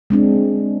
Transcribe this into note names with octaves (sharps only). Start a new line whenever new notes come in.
G#3 C4 D4